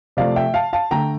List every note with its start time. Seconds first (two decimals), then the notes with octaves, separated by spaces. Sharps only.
0.17 C3 F3 A3 D5 F5
0.36 E5 G5
0.54 F5 A5
0.73 F5 A5
0.91 D3 A3 G5 A#5